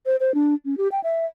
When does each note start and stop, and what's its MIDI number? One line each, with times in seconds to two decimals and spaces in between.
0.06 0.16 72
0.20 0.34 72
0.34 0.54 62
0.65 0.77 61
0.77 0.88 67
0.92 1.00 79
1.04 1.26 76